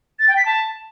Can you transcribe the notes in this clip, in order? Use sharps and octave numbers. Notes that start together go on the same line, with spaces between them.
A6
G5
B6
A5